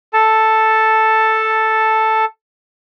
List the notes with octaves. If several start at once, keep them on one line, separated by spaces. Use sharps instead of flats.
A4 A5